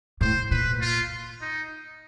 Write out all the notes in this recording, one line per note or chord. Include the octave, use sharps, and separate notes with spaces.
A2 C5
A#2 B4
F4
D#4